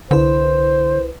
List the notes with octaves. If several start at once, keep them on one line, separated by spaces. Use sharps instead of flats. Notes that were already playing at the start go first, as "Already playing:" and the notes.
C2 D3 E4 B4 C5